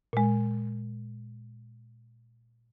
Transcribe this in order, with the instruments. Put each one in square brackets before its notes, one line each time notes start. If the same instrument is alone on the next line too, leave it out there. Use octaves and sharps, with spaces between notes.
[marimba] A#2 G#3